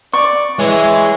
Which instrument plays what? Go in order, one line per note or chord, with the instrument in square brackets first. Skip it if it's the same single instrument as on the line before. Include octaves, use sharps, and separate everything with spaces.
[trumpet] D5 [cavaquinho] C#6
[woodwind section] E3 [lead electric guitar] G#3 G#4 [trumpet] C#5